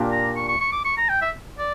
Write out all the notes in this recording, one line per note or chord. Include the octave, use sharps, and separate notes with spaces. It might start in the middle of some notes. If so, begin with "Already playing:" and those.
Already playing: A#2 A#3 D4 G4 A#4
A#5
C#6
C#6
C#6
D6
C#6
A#5
G5
E5
D5